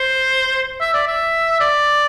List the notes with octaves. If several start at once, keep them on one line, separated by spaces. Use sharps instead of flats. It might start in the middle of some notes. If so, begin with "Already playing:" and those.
Already playing: C5
E5
D5
E5
D5